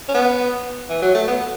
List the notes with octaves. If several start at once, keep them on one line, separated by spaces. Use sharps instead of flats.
C#4
B3
E3
F#3
A3
B3